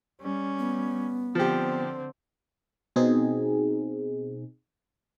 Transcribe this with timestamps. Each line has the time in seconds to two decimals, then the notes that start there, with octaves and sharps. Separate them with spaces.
0.21 G3 C#4
0.59 B3
1.35 D3 F3 C4 G4
2.96 B2 C4 D#4 G#4